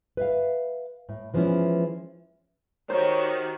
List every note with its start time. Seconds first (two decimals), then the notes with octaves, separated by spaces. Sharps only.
0.17 B4 E5 F5
1.09 A2
1.34 E3 F3 G#3 B3 C#4 E4
2.90 D#3 F#4 G4 C5 C#5